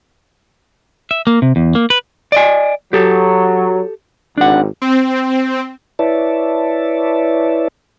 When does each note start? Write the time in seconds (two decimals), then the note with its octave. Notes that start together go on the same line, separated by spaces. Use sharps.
1.11 E5
1.27 A#3
1.42 C3
1.56 E2
1.75 A#3
1.90 B4
2.32 D5 D#5 G#5
2.93 F#3 G4 A4
4.38 G#1 D4 F#5
4.82 C4
5.99 E4 B4 C#5 D5 E5 A5